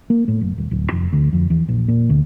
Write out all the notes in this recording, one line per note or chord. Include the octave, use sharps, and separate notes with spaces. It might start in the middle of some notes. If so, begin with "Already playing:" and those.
A#3
A2
F#1
D#1
D1
F1
D2
F2
E2
A#1
A#2
D2